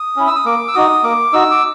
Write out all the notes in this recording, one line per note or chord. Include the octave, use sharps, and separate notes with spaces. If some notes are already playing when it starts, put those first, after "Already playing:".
Already playing: D#6
C#4 E4
E6
D#6
A#3 D6
E6
D#4 F#4 D#6
A#3 D6
D#4 F#4 E6
D6